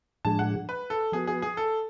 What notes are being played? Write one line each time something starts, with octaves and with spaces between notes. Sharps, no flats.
A2 F3 G#3 D4 G#4 A5
F#5
B4
A4
F3 B3 F#4 G#4 B4
G#4
G#4
A4